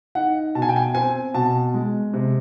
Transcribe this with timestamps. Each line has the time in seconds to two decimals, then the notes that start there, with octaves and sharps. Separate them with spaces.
0.15 D#4 F#5
0.55 B2 A5
0.62 G#5
0.69 G5
0.76 G#5
0.95 C4 G#5
1.34 B2 A5
1.74 G#3
2.14 C3